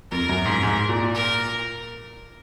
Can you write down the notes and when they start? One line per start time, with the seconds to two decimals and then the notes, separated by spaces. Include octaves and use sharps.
0.11 F2 A#4
0.29 F#2
0.45 G#2
0.63 G#2
0.89 A#2
1.15 A#4